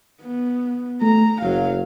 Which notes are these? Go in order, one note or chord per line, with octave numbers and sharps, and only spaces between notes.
B3
A3 A#5
F#1 F#3 F5